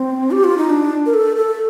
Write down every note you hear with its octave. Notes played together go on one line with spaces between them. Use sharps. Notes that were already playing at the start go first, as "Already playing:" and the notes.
Already playing: C4
G4
F4
D#4
D4
A#4
A4
A4